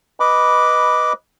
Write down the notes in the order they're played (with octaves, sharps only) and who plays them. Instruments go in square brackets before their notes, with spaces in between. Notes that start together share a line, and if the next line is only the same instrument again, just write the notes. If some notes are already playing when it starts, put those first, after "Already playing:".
[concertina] B4 D#5 B5 D6